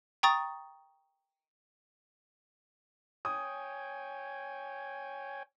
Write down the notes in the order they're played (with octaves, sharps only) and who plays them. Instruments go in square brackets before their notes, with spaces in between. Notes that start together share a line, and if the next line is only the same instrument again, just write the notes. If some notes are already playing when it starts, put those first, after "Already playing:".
[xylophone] G5 A#5 C#6 D#6 A6
[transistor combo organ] C#5 G5 G#5 [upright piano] D#6